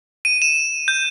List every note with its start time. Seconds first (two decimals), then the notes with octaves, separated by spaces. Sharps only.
0.25 D#7
0.42 E7
0.88 G6